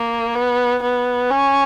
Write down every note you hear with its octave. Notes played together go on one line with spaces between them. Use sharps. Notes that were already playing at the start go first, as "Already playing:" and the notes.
Already playing: A#3
B3
B3
C#4